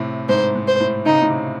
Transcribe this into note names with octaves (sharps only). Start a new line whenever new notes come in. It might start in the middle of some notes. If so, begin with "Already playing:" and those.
Already playing: A2 C3
G#2 C5
G#2
C5
A2
C#3 D#4
C3
A2
C3